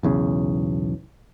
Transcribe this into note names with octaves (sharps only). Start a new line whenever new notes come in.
B1 E2 C#3